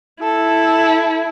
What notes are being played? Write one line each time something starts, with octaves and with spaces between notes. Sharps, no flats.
E4 A4